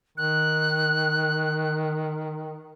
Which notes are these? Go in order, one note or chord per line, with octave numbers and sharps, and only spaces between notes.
D#3 F#6